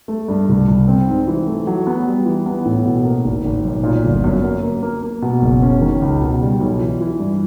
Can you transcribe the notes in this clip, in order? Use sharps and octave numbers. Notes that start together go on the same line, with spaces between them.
A3
G2
C2
C2
C4
G#2
E3
A3
F#3
B3
G3
E3
B3
A2
B2
A#3
G#1
G#1
B1
A#2
G1
F#2
A#3
A#3
A#3
A#3
B2
F#1
C#4
D#3
C#2
B2
G3
B1
E3
E3
G2